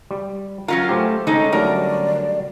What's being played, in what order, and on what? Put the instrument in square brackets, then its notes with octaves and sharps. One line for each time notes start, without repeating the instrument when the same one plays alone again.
[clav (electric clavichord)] G3
[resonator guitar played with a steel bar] F#3 C#4 F4 [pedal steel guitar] A#4
[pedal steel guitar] A3 [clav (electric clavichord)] G4 C5 G#5
[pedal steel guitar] D3 C#4 [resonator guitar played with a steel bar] G#3 D#4 A4
[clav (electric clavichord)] F#3 G3 A3 [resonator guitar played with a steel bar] A#4 A#5 [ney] D5